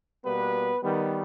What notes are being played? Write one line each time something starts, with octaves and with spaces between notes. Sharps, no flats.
B2 G3 A#3 B3 B4
D#3 G3 B3